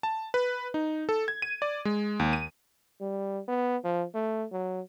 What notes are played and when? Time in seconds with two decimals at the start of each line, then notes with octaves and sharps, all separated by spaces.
0.03 A5
0.34 B4
0.74 D#4
1.09 A4
1.28 G#6
1.42 D#7
1.62 D5
1.85 G#3
2.20 D#2
2.33 D#7
3.01 G3
3.48 B3
3.84 F3
4.14 A3
4.52 F#3